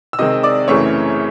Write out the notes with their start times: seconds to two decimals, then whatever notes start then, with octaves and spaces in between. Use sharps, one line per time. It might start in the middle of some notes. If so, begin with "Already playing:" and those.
0.13 E6
0.19 C3 D#3 G#3 C4 D#5 D#6
0.43 D5 D6
0.68 F#2 C#3 E3 A3 C4 C#5 C#6